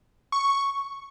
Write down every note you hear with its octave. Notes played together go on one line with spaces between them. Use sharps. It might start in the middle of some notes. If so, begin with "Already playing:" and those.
C#6